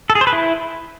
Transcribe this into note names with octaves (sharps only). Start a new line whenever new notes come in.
A4
G#4
C5
B4
E4